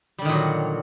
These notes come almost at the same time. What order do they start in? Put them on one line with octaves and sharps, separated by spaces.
G3 D3 D#3 A#2 F#3